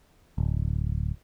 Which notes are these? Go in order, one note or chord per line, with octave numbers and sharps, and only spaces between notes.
D1